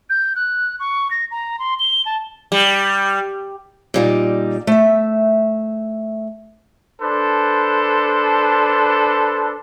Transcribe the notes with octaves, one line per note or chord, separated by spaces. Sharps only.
G6
F#6
C#6
A#6
A#5
C6
G7
A5
G3
A#2 G3 D#4
A3 E5
D4 A4 B4 C5